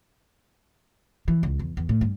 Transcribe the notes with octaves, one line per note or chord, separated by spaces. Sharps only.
E3
C#2
E2
E2
A2
G2